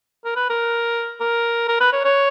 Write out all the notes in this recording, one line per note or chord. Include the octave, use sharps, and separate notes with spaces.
A#4
B4
A#4
A#4
A#4
B4
C#5
C#5